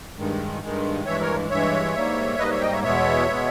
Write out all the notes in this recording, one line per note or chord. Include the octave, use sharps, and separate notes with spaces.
G2 D#3 G#3
G2 D#3 G#3
G2 E3 G#3 C#5 E5
A#4 C#5
G2 E3 G#3 C#5 E5
G#2 G3 A#3
G#2 G3 A#3 B4 D#5
C#5 E5
D#5 G5
C#5 E5
E2 B2 G#3 B3 C#5 E5
B2 G#3 B3